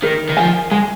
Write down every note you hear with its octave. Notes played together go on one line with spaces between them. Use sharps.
D#3 A#4
D#3
F3 G#5
G#3 G#5